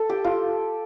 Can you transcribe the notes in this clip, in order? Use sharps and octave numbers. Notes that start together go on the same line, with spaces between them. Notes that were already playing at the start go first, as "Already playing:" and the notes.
Already playing: A4
G4
F4